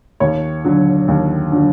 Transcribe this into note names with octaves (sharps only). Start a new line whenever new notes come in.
D#2 C#5
D3 F#3
D#2
D3 F#3